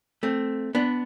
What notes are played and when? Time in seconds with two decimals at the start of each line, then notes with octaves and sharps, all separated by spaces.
0.23 A3 C4
0.75 B3 D4